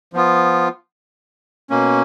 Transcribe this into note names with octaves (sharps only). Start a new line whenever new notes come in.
F3 B3 F4
B2 A#3 C#4